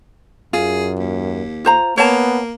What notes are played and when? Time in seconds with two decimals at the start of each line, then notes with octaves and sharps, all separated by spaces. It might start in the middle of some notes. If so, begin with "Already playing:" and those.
0.53 F#2 F4 G#4
0.99 D#2
1.65 F4 C5 A#5
1.98 A#3 B3 C#5 A5